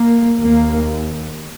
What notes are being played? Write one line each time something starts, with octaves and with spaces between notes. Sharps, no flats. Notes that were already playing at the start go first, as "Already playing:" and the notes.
Already playing: A#3
D#2 A#3